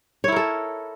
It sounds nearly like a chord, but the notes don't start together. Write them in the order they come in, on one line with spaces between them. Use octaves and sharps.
C#5 E4 A#4 A4